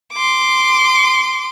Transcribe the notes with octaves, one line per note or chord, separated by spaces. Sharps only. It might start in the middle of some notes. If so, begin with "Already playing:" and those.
C6 D6